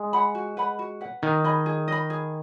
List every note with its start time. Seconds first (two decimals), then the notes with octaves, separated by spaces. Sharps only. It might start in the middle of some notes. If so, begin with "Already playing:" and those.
Already playing: G#3
0.13 F#5 B5
0.35 F#4
0.57 B4 F#5 B5
0.79 F#4
1.01 B4 F#5
1.22 D#3 D#4
1.44 G#4 D#5 B5
1.66 G#4
1.88 D#5 B5
2.10 G#4